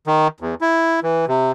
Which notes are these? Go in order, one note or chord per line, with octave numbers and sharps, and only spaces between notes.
D#3
E2
E4
E3
C3